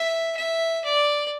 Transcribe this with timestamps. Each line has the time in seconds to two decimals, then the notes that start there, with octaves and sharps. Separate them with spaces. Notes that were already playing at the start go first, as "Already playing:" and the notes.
Already playing: E5
0.37 E5
0.85 D5